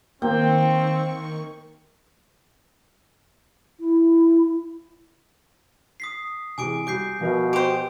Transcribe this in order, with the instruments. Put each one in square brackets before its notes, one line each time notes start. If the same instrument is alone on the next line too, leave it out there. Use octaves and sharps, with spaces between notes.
[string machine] D#3 C#6 [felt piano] A#3 [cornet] C4 [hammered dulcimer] G5
[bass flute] E4
[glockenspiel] D#6 B6 C7
[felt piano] C3 E3 G#3 [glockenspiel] G#5 D6 D7
[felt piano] G3 F#4 [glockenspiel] D6 G6 C7
[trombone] B2 [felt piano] F3 A#4 E5
[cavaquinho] G4 C5 [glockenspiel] D7